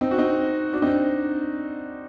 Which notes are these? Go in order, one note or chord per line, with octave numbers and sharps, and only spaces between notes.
C4 D#4
F#4
C4 D#4
D4 F#4
C4 D#4